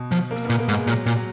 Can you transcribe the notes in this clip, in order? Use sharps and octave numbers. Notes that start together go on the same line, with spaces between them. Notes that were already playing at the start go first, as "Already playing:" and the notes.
Already playing: B2
F3
A#3
B3
A#2
A#3
G#2
G#3
A#2 F#3
A#2
F#3